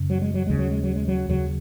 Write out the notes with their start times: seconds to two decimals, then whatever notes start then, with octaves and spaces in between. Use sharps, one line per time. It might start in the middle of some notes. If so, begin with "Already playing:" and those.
Already playing: F#2 C#3
0.10 F#3
0.22 G#3
0.34 F#3
0.47 D#2 C#3 G#3
0.59 F#3
0.71 G#3
0.83 F#3
0.96 G#3
1.08 F#3
1.29 D#2 C#3 F#3